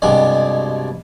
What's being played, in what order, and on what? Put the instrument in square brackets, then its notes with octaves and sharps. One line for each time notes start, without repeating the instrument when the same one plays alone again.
[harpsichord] C2 G2 B2 G3 G#3